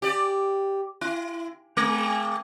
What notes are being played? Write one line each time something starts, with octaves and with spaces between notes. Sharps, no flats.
G4 D5
E4
G#3